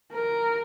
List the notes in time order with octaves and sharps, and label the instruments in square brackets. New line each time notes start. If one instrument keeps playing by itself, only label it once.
[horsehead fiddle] A#4